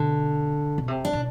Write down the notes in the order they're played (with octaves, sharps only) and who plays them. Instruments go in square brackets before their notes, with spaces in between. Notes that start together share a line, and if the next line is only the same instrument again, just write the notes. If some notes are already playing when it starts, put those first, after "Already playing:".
Already playing: [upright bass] B2 [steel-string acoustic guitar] D3
[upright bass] B2
C3
[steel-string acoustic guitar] D4
[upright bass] B2